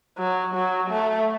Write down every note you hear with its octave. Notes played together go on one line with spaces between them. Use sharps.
F#3
F#3
A3